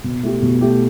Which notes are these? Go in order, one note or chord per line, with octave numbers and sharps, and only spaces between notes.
B2
A3 E4 G4
B2
A3 E4 G4